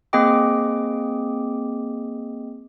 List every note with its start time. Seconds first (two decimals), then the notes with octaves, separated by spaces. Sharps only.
0.13 A#3 C4 G#4 D#5 G5 D6